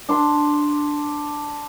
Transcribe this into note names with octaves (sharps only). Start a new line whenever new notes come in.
D4 C6